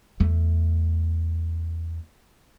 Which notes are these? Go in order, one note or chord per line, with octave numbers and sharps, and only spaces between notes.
E2 A3